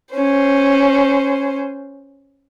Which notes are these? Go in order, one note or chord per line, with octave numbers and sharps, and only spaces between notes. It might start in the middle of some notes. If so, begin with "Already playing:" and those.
C#4 C5